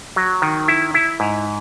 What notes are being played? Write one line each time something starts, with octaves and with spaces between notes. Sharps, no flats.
F#3
D#3
E4
E4
G#2